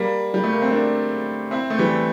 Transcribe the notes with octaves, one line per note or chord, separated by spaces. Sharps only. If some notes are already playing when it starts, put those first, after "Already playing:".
Already playing: G3 A#3
G3
A3
A#3
C4
A#3 D4
C4 E4
A3
E3 G3